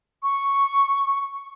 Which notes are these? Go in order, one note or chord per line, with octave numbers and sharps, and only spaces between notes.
C#6